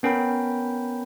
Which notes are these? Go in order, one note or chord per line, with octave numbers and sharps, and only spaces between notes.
B3 C#4 A#4 G5 B5